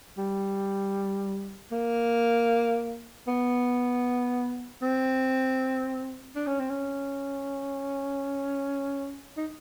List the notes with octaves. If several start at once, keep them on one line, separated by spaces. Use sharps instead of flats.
G3
A#3
B3
C4
D4
C#4
C4
C#4
D#4